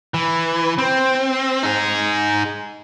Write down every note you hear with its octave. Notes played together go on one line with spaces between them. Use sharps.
E3
C4
D#4 G#4